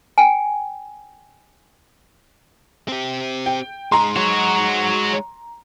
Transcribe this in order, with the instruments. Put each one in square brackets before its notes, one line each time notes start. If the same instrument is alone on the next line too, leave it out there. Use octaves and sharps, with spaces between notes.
[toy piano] G5 G#5
[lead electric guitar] C4 G4
[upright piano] G5
[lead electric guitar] G#3 D#4 [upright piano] A#5 C6
[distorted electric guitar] F#4 C#5